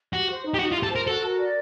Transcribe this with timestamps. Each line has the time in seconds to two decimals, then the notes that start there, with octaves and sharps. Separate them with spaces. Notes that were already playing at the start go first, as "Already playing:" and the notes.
0.13 F#4 G4
0.29 C5
0.44 D#4
0.54 G4
0.59 D#4 F#4
0.72 F4
0.76 G4
0.83 A4
0.91 A#4 C5
1.07 F#4 A4
1.23 A#4
1.38 D5